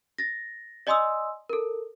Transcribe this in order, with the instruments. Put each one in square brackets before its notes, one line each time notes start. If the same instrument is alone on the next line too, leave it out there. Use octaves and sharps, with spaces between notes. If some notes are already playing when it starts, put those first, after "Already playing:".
[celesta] A6 A#6
D5 D#5 G#5 C6 D#6 E6
A4 A#4